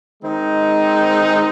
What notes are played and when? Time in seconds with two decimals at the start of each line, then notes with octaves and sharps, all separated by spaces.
0.23 D#3 G#3 C4 D#4